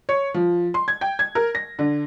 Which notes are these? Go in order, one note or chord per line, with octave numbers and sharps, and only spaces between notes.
C#5
F3
C6
G#6
G5
G#6
A#4
A#6
D3